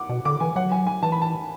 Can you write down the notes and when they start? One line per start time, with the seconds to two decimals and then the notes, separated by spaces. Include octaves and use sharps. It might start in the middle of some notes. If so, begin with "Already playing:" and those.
Already playing: F#5 D6
0.09 B2
0.25 D3 D6
0.40 E3 G#5
0.56 F#3 F#5
0.72 G#5
0.87 G#5
1.03 E3 A5
1.12 B5
1.22 A5